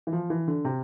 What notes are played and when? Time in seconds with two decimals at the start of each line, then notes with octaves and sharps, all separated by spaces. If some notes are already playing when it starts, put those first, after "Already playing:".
0.07 E3
0.13 F3
0.30 E3
0.48 D3
0.65 C3